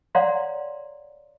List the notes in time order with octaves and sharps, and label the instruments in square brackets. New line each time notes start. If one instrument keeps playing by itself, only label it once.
[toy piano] C#5 D5 F5 F#5 A#5 C6